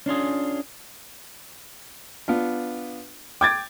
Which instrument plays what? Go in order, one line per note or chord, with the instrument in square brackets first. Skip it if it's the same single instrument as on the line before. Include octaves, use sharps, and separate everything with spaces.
[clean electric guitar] C#4 D4 F4 G#4
[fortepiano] B3 D4 F4
[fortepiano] G5 [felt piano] D6 G#6 A6